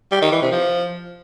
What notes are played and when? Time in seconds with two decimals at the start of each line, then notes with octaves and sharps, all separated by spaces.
0.11 G3
0.21 D#3
0.32 E3
0.42 C3
0.52 F3